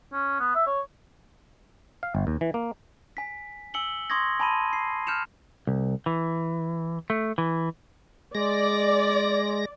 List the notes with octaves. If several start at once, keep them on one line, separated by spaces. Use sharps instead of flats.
C#4
B3
E5
C#5
F5
G1
D#2
E3
A#3
G#5 B6
G#5 E6 C#7 F#7 G7
C6 C#6 D#6 G#6 A#6
G#5 A5 B5 C6 D#7
C7
F6 G6 C#7 E7 F7
C2
E3
A3
E3
G#3 D5 A#6